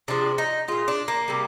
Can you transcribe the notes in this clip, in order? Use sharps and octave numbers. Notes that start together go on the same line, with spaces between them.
C3 F3 G#3 D4
D#4
A#2 G#3 F4
D4
A#3
C3 G3